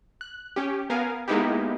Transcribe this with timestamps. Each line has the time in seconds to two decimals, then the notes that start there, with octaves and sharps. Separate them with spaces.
0.21 F#6
0.56 C#4 G4
0.90 B3 A#4 F5 G#5
1.28 G#3 A#3 B3 D#4 E4 G4